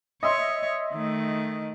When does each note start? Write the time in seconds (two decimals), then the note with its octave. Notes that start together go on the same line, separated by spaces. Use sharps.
0.23 C#5 D#5 E5 C6
0.93 D#3 A3